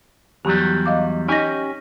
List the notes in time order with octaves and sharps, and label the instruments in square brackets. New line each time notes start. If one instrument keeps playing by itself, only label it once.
[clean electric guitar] E2 F#3 G3 [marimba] G4
[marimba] D#5 F5 D6
[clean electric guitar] C#4 G4 G#5 [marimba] D#4 D#5 A#6